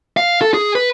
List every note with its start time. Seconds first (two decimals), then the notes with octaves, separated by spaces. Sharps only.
0.17 F5
0.41 A4
0.54 G#4
0.75 B4